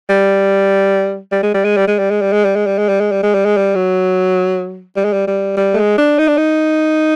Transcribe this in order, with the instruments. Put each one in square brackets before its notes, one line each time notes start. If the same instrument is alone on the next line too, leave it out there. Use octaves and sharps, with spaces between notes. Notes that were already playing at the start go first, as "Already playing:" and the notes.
[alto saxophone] G3
G3
G#3
G3
G#3
G3
G#3
G3
G#3
G3
G#3
G3
G#3
G3
G#3
G3
G#3
G3
G#3
G3
G#3
G3
F#3
G3
G#3
G3
G3
G3
A3
G#3
D4
D#4
D4
D#4